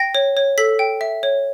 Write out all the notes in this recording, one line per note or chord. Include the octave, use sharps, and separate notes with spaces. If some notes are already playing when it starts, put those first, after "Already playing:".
Already playing: G5 A#6
C#5
C#5
A4 B6
G5
E5
C#5